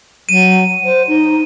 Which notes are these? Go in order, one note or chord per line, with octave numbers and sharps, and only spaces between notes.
F#3 D#7
C5
D#4